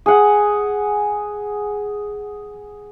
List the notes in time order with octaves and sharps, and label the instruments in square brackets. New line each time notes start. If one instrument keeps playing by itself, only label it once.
[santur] G#4 F#5